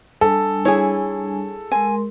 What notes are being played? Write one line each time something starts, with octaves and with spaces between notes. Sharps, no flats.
G3 D4 A4 G#5
E4 G#4 C#5
G#3 A#4 G#5 C6